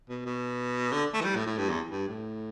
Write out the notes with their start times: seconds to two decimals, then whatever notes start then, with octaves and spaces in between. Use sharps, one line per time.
0.09 B2
0.26 B2
0.92 D3
1.14 A3
1.21 E3
1.25 G3
1.36 A2
1.46 A2
1.58 G2
1.69 E2
1.91 G2
2.08 A2